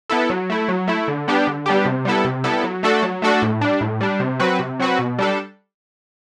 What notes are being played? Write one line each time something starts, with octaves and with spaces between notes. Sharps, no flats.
B3 E4 A4
F#3
A3 E4
F#3
A3 E4
D3
G3 B3 D4 G4
D3
G3 B3 D4 G4
C3
G3 B3 E4 A4
C3
G3 B3 E4 A4
F#3
A3 D4 F#4 A4
F#3
A3 D4 F#4 A4
A2
G3 D4
A2
G3 D4
C3
F#3 C4 F#4 B4
C3
F#3 C4 F#4 B4
B2
G3 D4 A4